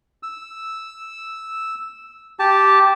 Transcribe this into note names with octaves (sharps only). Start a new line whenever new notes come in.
E6
G4 A5